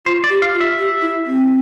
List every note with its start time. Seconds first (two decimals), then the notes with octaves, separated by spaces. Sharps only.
0.06 F4 C5
0.24 D5
0.30 G4
0.42 F5
0.54 F4
0.61 E5
0.78 G4
1.01 E4
1.26 C4